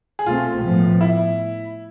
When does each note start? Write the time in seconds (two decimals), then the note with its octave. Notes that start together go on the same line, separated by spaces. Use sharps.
0.19 G#4
0.26 B2 A3 C4 F4
0.63 A2 F3 B3
1.01 E4